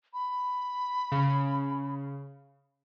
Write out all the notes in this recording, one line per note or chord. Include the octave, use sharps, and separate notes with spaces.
B5
C#3